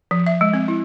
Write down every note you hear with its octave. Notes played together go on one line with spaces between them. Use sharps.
F3
E5
G#3
C4
E4